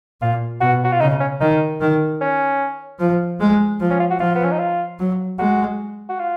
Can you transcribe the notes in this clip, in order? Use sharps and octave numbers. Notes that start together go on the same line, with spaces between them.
A#2 F4
B2 F#4
F#4
F4
C#3 D#4
C#4
D#3 D#4
D#3
C#4
F3
G#3
F3
C#4
F4
F#4
F3 F4
B3
C#4
D#4
F4
F#3
G#3 F#4
F#4
F4